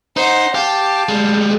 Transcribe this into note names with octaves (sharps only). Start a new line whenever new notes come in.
D#4 C5 F#5
G4 F5 A5
G3 G#3